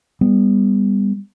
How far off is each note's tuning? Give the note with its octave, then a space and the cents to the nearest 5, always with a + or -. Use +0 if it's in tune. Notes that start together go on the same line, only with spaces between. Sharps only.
G3 +25 B3 +0